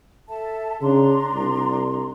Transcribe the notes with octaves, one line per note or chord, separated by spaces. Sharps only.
A4 E5 A5
C#3 D4 A#5 C6
C2